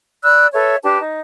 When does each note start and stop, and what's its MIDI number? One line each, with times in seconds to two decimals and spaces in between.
0.23 0.47 74
0.23 0.47 83
0.23 0.47 88
0.23 0.47 90
0.53 0.76 69
0.53 0.76 71
0.53 0.76 73
0.53 0.76 76
0.83 0.99 62
0.83 0.99 67
0.83 0.99 71
0.83 0.99 81
0.99 1.19 63